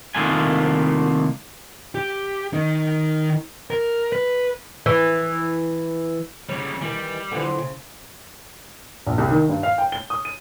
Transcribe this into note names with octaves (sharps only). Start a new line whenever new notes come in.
C2 D#3 A3 A#3 F4 G#5
G4
D#3 D#4
A#4
B4
E3
C#3 G3 C#5
D#3 E3 G3
D3 E3 F3
C#3
A#1
C2
D#3
G2
F5
G5
G7
D#6
D#7